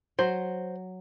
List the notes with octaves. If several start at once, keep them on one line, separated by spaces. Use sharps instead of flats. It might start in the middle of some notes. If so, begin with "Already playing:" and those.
F#3 C5